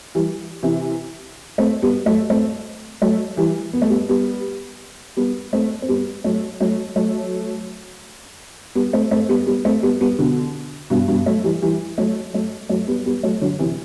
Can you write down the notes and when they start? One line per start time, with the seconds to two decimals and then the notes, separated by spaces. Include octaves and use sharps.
0.15 E3 G3
0.63 C3 E3
1.58 A3 C4
1.82 G3 B3
2.06 F#3 A3
2.30 A3 C4
3.02 F#3 A3
3.37 E3 G3
3.73 B3
3.82 A3
3.90 G3 B3
4.09 G3 B3
5.17 G3 B3
5.53 A3 C4
5.82 C4
5.89 G3 B3
6.24 F#3 A3
6.60 F#3 A3
6.96 F#3 A3
8.75 G3 B3
8.93 A3 C4
9.11 A3 C4
9.29 G3 B3
9.47 G3 B3
9.65 A3 C4
9.83 G3 B3
10.01 G3 B3
10.19 B2 D3
10.90 G2 B2
11.08 G2 B2
11.26 F#3 A3
11.44 E3 G3
11.62 E3 G3
11.98 F#3 A3
12.34 F#3 A3
12.69 F#3 A3
12.88 G3 B3
13.06 G3 B3
13.23 F#3 A3
13.41 D3 F#3
13.59 C3 E3